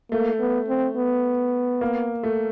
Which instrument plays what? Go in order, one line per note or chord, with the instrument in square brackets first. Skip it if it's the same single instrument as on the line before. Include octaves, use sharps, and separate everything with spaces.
[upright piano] A3 [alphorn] A#3
[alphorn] B3
C4
B3
[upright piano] A#3
A3